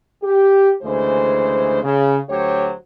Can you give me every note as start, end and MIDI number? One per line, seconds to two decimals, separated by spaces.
0.23 0.72 67
0.83 1.82 38
0.83 1.82 49
0.83 1.82 52
0.83 1.82 56
0.83 1.82 72
1.83 2.19 49
2.30 2.72 38
2.30 2.72 54
2.30 2.72 67
2.30 2.72 72
2.30 2.72 73